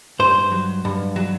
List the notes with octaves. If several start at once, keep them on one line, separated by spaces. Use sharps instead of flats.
G2 C5
F#3
G2
F#3